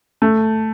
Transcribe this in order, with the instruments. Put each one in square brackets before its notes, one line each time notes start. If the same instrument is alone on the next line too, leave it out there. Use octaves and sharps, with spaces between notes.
[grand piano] A3